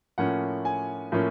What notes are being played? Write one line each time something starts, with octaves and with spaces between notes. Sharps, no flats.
A2 F3 A#3 C#4 F#5
G#5
A2 F3 A#3 C#4